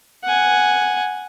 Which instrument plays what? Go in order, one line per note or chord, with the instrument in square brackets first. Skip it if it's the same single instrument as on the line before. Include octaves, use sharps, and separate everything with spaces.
[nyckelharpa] F#5 G#5